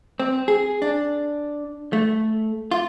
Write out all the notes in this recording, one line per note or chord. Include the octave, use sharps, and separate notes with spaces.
C4
G#4
D4
A3
F4